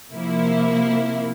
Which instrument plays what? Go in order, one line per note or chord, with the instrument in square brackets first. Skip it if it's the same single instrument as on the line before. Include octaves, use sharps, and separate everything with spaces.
[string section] C3 F3 A#3 E4